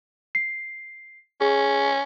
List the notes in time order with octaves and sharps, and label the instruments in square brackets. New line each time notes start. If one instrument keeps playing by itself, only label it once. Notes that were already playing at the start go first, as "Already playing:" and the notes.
[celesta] C7
[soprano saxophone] C#4 [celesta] G#4